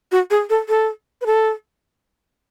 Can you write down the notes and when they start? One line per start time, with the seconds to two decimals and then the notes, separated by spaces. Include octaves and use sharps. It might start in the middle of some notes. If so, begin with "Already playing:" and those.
0.12 F#4
0.31 G#4
0.50 A4
0.69 A4
1.21 B4
1.26 A4